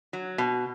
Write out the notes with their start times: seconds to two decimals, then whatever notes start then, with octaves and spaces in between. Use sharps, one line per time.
0.13 F#3
0.38 B2